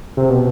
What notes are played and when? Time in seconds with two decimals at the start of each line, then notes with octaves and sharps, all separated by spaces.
0.17 C3
0.30 B2